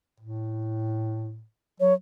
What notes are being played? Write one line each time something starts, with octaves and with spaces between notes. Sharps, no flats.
A2
F#3 C#5